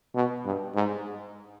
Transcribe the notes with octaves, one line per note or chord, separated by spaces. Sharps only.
B2
G2
G#2